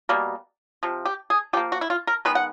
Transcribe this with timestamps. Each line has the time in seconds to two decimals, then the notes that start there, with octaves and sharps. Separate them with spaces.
0.09 B2 G3 A#3
0.83 C3 F3
1.05 G4
1.30 G#4
1.53 F3 G4
1.57 A#3
1.72 F#4
1.81 E4
1.90 F4
2.07 A#4
2.25 D#3 G#3 B3 B4
2.35 F#5